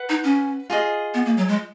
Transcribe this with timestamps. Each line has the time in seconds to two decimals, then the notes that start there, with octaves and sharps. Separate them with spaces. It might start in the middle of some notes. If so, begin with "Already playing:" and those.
Already playing: B4 F#5
0.09 D#4
0.24 C#4
0.70 F4 G#4 D#5
1.14 B3
1.26 A#3
1.37 F#3
1.48 G#3